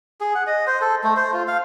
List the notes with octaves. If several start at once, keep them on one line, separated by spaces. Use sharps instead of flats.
G#4
F#5
D#5
C5
A4
A3
C5
F4
F5